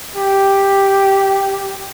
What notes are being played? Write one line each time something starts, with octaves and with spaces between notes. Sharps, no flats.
G4